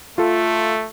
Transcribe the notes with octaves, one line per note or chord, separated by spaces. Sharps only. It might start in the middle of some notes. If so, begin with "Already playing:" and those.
A3 F4 A4